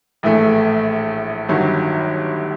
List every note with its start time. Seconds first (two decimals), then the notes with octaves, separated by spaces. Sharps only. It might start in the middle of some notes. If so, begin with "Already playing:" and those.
0.23 A#1 A2 E3 A3
1.48 G1 G2 D#3 F#3